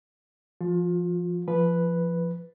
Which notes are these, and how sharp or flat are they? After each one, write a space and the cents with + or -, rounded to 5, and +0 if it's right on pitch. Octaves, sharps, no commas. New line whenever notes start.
F3 -20 F4 +30
F3 -20 B4 +0